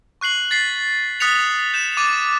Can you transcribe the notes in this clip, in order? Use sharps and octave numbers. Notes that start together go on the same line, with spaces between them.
C#6 F#6 C7 F#7
A6 B6 C7
D#6 F#6 A6 B6 C#7 F7
G6 E7
D6 A6 D#7